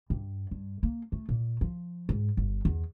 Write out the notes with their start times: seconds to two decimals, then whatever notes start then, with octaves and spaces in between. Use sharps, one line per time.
0.10 G2
0.51 G2
0.83 A#3
1.12 A3
1.29 A#2
1.61 F3
2.09 G#2
2.37 G1
2.65 E2